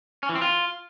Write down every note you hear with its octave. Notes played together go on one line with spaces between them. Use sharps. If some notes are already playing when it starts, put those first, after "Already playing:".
C#4
E3
C4
F4